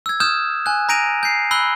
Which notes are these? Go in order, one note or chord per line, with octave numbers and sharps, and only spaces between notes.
E6 G#6
D#6 F6 G6 E7
G#5 F#6
A#5 G6 A#6 D7 D#7 F7
G6 C7
B5 E6 F#6 G7